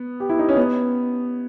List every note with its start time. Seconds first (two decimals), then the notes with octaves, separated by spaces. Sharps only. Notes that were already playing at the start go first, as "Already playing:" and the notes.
Already playing: B3
0.20 G4
0.29 E4
0.39 D#4
0.49 C#4
0.57 B3